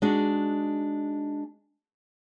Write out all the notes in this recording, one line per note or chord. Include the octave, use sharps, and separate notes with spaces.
G#3 D4 D#4 F#4